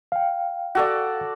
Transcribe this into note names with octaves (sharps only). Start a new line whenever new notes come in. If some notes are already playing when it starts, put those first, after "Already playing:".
F5 G5
F#4 A4 D5